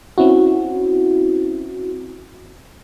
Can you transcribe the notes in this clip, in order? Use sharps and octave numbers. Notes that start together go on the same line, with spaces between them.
C4 C#4 E4 F#4